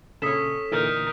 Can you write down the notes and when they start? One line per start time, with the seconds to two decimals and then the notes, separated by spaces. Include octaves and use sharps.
0.22 A#2 C#3 C#4 A4 D#6 B6 E7
0.72 A#2 D3 E3 D#4 A#4